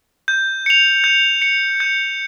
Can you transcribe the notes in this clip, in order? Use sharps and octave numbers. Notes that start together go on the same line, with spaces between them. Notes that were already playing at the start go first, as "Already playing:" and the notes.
G6
C#7 F7
G6
C#7 F7
G6